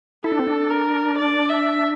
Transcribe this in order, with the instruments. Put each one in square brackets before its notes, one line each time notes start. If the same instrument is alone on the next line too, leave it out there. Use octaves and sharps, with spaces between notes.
[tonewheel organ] E4 [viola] A4
[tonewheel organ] D4
C4
D4
[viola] A#4
D5
E5